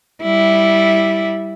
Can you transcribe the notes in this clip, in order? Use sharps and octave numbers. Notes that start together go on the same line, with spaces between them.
G3 E4